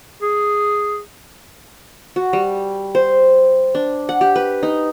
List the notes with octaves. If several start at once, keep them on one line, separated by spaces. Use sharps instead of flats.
G#4
F#4
G3
C5
D4
F#5
G4
B4
D#4